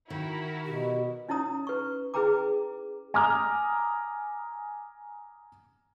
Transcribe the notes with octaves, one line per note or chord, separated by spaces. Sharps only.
D#3 E4 F#4 A#4
B2 G4
C#4 D#4 E4 C#5 A#5 D#6
B4 C#6
E4 G#4 B4 G5 A#5 D6
G#5 A#5 D6 D#6 F6